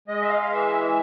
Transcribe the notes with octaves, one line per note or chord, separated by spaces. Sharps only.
G#3 D#5
E5
F5
F5
E3 E5